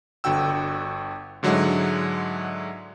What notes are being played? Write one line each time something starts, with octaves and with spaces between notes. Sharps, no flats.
G1 D3 F#4 G5 E6
G#2 D3 F#3 G#3 E4 F#5